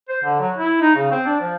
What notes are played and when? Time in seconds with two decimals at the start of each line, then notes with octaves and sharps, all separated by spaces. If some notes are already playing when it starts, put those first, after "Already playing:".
0.09 C5
0.24 D3
0.40 F#3
0.57 E4
0.81 D#4
0.95 C#3
1.11 C4
1.26 D4
1.41 F3